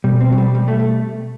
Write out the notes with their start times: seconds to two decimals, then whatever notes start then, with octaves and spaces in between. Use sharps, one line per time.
0.04 B2 G3
0.21 C4
0.32 F#3
0.38 G3
0.55 G3
0.68 A3
0.79 A3